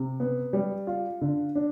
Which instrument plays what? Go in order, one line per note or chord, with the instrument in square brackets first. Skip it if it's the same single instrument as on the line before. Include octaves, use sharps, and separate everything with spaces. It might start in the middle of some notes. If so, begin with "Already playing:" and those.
Already playing: [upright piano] C3
B3
G3
F4
D3
D4